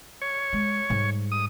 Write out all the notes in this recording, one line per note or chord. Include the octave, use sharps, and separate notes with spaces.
C#5
G#3
G#2 G3
D#6